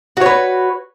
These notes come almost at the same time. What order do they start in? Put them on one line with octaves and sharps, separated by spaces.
F#4 C#5 B4